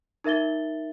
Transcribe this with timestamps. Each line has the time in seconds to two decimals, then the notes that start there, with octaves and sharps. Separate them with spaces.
0.24 D#4 A#4 E5 A6 G7